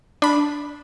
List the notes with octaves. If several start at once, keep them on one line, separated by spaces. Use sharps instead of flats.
D4 B5